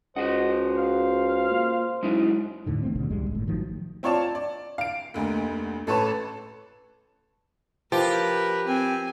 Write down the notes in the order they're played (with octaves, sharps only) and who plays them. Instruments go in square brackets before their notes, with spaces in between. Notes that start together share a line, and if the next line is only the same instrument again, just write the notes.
[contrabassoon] C#2 [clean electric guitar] F#4 G#4 F#5 [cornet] C5 [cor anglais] D#5
[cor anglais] F5
[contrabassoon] A#2
[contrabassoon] F#2 [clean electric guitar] G#3 D#4 E4
[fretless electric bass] D#2 A2 D3 D#3
D#3 A3 B3 C4
G#1 D#2 B2 D3
C#2 G#2 G3 G#3
G1 A2
A1 D#3 F3 F#3
[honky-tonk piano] C4 F4 C#5 D5 A5
D5
F5 D7
F1 D2 A#3
A1 A4 B4 C#5 A5
[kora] F3 [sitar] G4 [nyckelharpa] A#4 B4
[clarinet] C4 [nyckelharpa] G#5